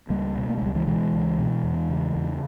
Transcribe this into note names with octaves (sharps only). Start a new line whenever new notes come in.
C#2 G3 A#3
B2
A#3
G#3
C#2 G3
E3 G#3
B2 E3 G#3
C#2
B2
E2
C#3
E2